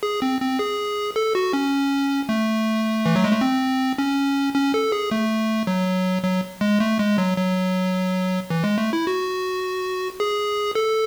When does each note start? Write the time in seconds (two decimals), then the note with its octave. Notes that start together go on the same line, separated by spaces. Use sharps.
0.03 G#4
0.22 C4
0.41 C4
0.59 G#4
1.16 A4
1.35 F#4
1.53 C#4
2.29 A3
3.06 E3
3.16 F#3
3.24 G#3
3.32 A3
3.41 C4
3.98 C#4
4.55 C#4
4.74 A4
4.92 G#4
5.11 A3
5.67 F#3
6.23 F#3
6.61 G#3
6.80 A3
6.99 G#3
7.18 F#3
7.37 F#3
8.50 E3
8.64 G#3
8.78 A3
8.93 E4
9.07 F#4
10.20 G#4
10.75 A4